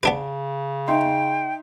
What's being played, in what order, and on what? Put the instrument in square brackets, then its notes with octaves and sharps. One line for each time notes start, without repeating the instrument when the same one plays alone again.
[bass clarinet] C#3 [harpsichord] B3 D4 B4
[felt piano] D#4 E5 C6 [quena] G5